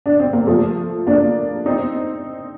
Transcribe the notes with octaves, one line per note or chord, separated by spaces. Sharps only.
D4
C4
A#3
F3 A3
A#3 D4
C4 D#4